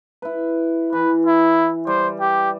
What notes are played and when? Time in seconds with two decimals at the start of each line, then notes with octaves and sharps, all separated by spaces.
0.22 E4 B4
0.93 E3 B4
1.26 E4
1.87 G3 C5
2.20 G4